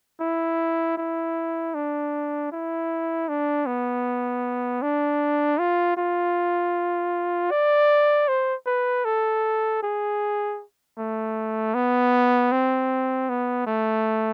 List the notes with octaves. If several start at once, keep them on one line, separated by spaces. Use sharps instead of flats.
E4
E4
D4
E4
D4
B3
D4
F4
F4
D5
C5
B4
A4
G#4
A3
B3
C4
B3
A3